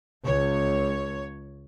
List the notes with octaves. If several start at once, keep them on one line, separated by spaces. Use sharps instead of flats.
C#2 C#5